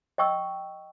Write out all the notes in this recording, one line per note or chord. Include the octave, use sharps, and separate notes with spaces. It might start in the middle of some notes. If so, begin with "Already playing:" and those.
D#5 G5 C#6 E6